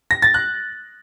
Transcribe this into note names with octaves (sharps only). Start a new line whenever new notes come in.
A#6
A6
F#6